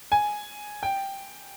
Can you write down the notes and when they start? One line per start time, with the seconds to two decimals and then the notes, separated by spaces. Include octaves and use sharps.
0.12 G#5
0.83 G5